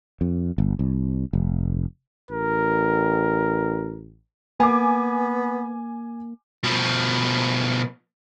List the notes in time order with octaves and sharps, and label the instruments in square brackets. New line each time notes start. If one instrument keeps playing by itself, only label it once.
[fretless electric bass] F2
G1
C2
F1
[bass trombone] A1 [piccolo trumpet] A#4
[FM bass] A#3 [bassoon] B3 [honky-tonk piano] G#5 D6
[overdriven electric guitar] B2 F3